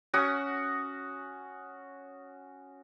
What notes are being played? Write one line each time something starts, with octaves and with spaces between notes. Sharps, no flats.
C#4 F#4 F#5 D#6